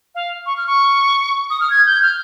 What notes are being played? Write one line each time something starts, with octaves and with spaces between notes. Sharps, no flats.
F5
C#6
F6
C#6
D#6
F6
G#6
G6
F6